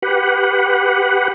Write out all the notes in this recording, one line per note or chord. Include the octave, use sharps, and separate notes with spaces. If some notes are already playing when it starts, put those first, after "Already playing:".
G4 B4 F#5